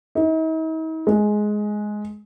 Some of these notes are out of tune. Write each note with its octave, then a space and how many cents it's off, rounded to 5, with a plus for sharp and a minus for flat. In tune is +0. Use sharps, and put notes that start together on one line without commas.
D#4 +45
G#3 +10